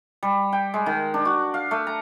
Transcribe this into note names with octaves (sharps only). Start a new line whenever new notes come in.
G3
G5
G#3
D#3
D4
F#4
F5
A3
A#5